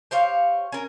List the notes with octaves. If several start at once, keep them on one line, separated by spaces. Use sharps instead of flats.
G4 C5 C#5 F5
C#4 A#4